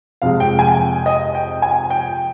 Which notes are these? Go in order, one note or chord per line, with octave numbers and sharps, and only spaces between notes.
F2 C3 F3 G#3 F5
G5
G#5
G5
D#5
G5
G#5
G5